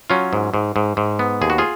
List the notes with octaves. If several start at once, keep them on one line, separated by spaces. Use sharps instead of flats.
F#3 C#4 F4
G#2
G#2
G#2
G#2
B3
D#2 G#4
F#4
F4 G#4